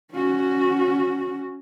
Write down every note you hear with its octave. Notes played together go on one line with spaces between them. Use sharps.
C#4 F#4